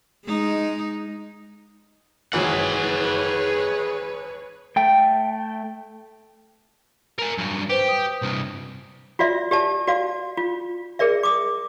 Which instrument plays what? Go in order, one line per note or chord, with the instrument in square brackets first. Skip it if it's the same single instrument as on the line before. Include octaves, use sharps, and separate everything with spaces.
[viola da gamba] G#3 D#4
[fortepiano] G#1 E3 F#3 [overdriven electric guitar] G#4 F#5 [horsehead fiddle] B4 C#5
[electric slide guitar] A3 G5
[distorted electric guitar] A#4 G#5
G2 F#3
[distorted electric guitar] G4 [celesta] B4 C5 G5
[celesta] D#6
[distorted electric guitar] C2 G2
[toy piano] F4 F#4 D5 E5
G4 D5 A5
F#4 D5 F5
F4
G#4 A#4 D5 E5
D6 D#6